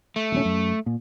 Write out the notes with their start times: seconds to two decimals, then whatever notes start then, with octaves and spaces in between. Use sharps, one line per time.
0.16 A3
0.32 D#1 B1 C#4
0.45 F#2
0.86 A#2